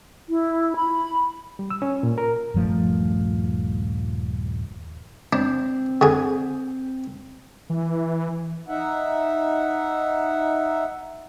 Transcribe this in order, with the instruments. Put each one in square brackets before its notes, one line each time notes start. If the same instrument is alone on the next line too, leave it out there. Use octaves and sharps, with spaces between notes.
[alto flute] E4
B5
[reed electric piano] G3
E6
C#4
A#2
A#4
[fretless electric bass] D#1 G2 F3 A3
[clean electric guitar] C4 [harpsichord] D4
[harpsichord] D3 G#4
[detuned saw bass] E3
[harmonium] D#4 E5 F#5